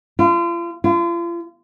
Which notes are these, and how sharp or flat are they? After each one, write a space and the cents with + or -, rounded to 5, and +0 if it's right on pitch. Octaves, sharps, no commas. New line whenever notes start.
F4 -40
F4 -40